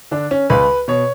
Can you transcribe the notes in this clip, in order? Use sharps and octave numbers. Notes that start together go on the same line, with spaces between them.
D3 D4
C#4
C#2 B4
B2 C#5